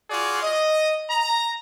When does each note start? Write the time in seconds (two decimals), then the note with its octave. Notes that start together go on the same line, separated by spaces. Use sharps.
0.10 F4 F#4 G#4 D5
0.43 D#5
1.10 A#5